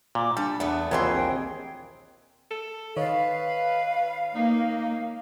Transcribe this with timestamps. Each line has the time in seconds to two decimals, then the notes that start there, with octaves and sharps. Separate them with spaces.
0.15 A#2 D6
0.37 G3 D4 A4
0.60 E2 A3 B3
0.91 A#1 D#2 E3 F#3 C4 G#4 C6
1.14 G5
2.51 A4
2.96 D#3 B4 C#5 D#5 F5
4.35 A#3 D#4